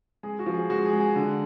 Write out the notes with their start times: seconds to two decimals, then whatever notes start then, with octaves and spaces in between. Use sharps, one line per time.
0.23 G#3 G#4
0.39 F#4
0.46 F3
0.54 G#4
0.70 G#3 F#4
0.85 G#4
0.93 G#3
1.00 G#4
1.16 D3